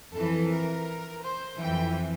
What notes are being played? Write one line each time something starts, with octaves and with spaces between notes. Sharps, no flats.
F2 E3 A4
A#4
C5
F2 E3 G5